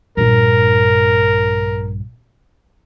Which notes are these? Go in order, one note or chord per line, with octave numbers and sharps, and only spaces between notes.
A#1 G2 A#4